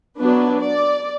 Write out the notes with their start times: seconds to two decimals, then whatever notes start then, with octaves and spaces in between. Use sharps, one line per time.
0.19 F#3 B3 D4 B4
0.62 D5